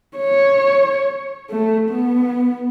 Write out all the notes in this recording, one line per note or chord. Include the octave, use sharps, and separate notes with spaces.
C#5
A3
B3